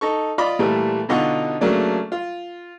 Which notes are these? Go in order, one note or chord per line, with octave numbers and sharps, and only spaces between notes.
D#4 A4 C#6
F4 D5 D#5 B5 D6
A#2 E3 G3 A3
B2 D3 D#4 F4 F#5 C#6
C#3 F#3 A3 A#3 D4
F4